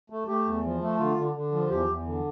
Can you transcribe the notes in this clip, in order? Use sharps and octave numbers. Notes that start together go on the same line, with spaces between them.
A3
A3 G4
E2
F3
A3
D3 F4
D3
D3
F3
E2 G4
E2
D3